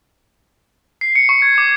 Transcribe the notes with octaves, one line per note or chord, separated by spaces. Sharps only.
C7
C#7
C#6
G#6
D6